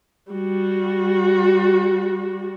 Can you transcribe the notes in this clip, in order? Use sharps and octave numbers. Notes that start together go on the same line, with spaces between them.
G3 F#4